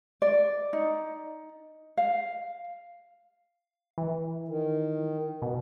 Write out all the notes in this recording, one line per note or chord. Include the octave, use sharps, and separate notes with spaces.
D5
D#4
F5
E3
D#3
B2